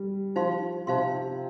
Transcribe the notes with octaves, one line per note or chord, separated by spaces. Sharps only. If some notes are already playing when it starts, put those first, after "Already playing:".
Already playing: G3
F3 D#4 C5 F5 C6
C3 D#4 C5 F5 C6